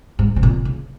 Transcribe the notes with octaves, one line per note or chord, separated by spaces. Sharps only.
G#2
C3
A#2
C#3